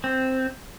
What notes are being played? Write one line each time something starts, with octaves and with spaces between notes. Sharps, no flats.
C4